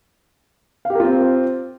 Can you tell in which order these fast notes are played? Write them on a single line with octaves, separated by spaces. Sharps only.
F5 G4 A#4 F4 C4